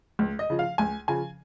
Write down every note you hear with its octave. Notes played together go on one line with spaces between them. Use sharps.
C#2
D#5
C#3 F3
F5
C#2 G#5
C#3 F3 G#5